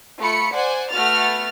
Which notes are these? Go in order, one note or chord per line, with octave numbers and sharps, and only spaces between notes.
A3 F4 B5 C#7
C5 D5 F#5 G#5
A3 B3 F#4 F6 A6